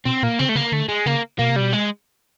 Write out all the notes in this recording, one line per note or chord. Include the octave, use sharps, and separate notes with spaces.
B2 C4
A#2 A#3
C#3 C4
A3
C#3 A#3
D3 A3
G#3
C#3 A#3
B2 A#3
C3
B2 G3
G#3